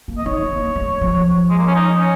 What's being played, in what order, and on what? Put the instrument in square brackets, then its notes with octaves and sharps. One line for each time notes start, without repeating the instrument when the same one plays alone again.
[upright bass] A#3
[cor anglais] D#5
[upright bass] D#4 [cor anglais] C#5
[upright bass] A#3
G#3
F3
[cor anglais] G#3
A#3
C#4
D#4
C#4